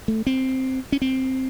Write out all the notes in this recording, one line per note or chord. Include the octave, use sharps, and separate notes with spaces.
A3
C4
C#4
C4